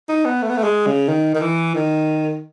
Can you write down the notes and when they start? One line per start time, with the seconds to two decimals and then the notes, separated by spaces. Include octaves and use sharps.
0.09 D#4
0.25 B3
0.42 A3
0.49 B3
0.57 A3
0.63 G#3
0.86 C#3
1.08 D#3
1.35 D#3
1.41 E3
1.75 D#3